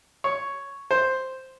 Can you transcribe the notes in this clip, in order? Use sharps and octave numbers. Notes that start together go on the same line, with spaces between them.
C#5
C5